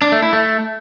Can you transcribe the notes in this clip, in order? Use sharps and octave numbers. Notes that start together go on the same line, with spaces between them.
D4
A3
E4
A3